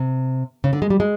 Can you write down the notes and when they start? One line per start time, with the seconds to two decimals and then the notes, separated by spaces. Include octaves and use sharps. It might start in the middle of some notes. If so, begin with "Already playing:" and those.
Already playing: C3
0.64 C#3
0.73 D3
0.82 G#3
0.90 G3
1.00 G#3